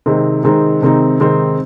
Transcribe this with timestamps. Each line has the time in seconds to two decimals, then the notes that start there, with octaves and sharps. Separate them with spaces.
0.06 C3 D#3 G#3 C4 D#4
0.44 C3 D#3 G#3 C4 D#4
0.82 C3 D#3 G#3 C4 D#4
1.20 C3 D#3 G#3 C4 D#4